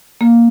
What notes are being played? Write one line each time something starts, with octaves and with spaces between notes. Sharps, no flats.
A#3